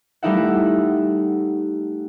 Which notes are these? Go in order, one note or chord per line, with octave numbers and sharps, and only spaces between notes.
G3 A3 D#4 E4 E5 F#5